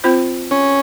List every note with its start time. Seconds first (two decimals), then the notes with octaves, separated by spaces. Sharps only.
0.04 C4 F4 C5
0.51 C#4